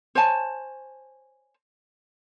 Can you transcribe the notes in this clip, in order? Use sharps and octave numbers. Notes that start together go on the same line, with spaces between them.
C5 C#5 G#5 A5